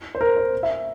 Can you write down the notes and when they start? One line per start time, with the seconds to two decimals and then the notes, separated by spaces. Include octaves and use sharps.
0.15 C5
0.21 A#4
0.37 C5
0.63 E5